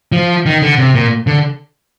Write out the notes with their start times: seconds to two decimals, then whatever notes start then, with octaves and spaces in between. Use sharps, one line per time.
0.12 F3
0.46 D#3
0.62 D3
0.78 C3
0.95 A#2
1.27 D3